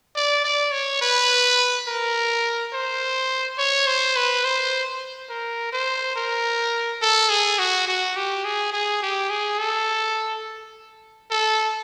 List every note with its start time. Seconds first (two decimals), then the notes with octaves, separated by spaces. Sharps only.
0.16 D5
0.45 D5
0.72 C#5
1.02 B4
1.88 A#4
2.73 C5
3.59 C#5
3.87 C5
4.16 B4
4.45 C5
5.30 A#4
5.73 C5
6.16 A#4
7.02 A4
7.30 G#4
7.59 F#4
7.88 F#4
8.16 G4
8.45 G#4
8.73 G#4
9.03 G4
9.30 G#4
9.59 A4
11.31 A4